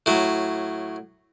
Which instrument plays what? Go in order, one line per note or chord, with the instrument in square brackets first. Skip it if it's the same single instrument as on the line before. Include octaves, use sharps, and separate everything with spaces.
[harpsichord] A2 F#3